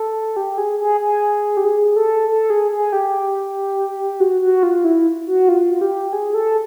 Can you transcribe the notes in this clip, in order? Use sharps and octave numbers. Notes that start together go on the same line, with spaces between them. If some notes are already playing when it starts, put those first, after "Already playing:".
Already playing: A4
G4
G#4
G#4
G#4
G4
G#4
A4
A4
G#4
G#4
G4
F#4
F#4
F4
E4
F#4
F4
G4
G#4
A4